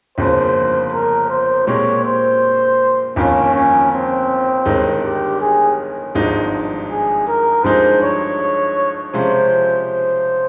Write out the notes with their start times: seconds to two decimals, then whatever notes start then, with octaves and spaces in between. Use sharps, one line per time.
0.18 G1 F2 C#3 F3 A#3 C5
0.93 A#4
1.30 C5
1.67 A#2 G#3 C4 G4 A#4 C#5
2.05 C5
3.16 G1 F2 D#3 A#3 C#4 F4
3.54 C#4
3.91 C4
4.66 G1 G2 D#3 G#3 D#4
5.03 G4
5.41 G#4
6.15 G#1 G2 F3 G#3 D#4
6.90 G#4
7.27 A#4
7.64 G2 F3 G#3 D#4 G#4 C5
8.02 C#5
9.14 C3 F3 G#3 C#4 F4 C5
9.89 C5